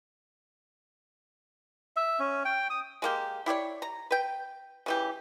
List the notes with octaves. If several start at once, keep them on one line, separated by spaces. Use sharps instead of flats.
E5
C#4
G5
D#6
G#3 A#3 G4
E4 G4 C#5 D5
A#5
B4 G5
C#3 E3 G4